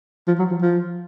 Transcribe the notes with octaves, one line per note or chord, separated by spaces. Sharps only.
F3
F#3
F3
F3